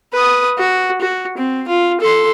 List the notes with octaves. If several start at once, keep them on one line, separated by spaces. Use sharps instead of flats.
B4 D#6
F#4
F#4
C4
F4
A4 C6